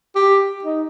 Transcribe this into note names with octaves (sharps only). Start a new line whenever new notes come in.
G4
D#4